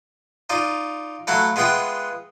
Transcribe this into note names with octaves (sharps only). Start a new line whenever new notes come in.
D#4 F4 D5
F#3 A3 E4 F#4 F5 F#5
G#3 B3 F4 E5 F#5 G5